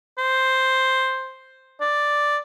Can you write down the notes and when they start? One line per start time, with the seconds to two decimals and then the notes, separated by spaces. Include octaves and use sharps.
0.18 C5
1.81 D5